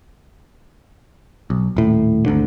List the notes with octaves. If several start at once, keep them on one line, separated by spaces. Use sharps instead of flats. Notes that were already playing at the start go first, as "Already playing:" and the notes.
B1
D#1 A2
G#1 D2 D3